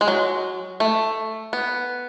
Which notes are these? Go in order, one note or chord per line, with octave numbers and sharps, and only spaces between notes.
G#3
F#3
A3
B3